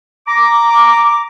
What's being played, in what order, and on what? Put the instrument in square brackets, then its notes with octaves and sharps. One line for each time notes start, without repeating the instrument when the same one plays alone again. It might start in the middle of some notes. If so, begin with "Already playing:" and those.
[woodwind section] A#5 D6